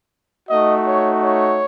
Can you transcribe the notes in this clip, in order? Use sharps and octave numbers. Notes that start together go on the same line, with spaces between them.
A3 D#4 F#4 D#5
C#5
C#5